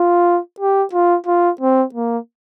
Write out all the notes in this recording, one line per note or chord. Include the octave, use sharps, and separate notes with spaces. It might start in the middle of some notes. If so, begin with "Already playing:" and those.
Already playing: F4
G4
F4
F4
C4
A#3